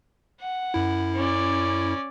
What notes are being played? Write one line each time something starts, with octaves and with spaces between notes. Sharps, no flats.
F#5
F#2 E4
C#4 D5